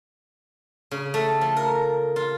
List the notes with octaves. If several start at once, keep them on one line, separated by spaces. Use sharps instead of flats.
C#3
A3
F3
A#4
F4